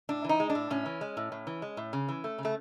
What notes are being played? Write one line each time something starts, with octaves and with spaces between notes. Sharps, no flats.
A2 D4
E3 D#4
G#3
D4
A2
A2 C#4
E3
G#3
A2
A2
E3
G#3
A2
C#3
E3
A3
C#3
A3